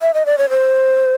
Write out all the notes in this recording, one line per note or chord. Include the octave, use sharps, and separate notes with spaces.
E5
D#5
D5
C#5
C5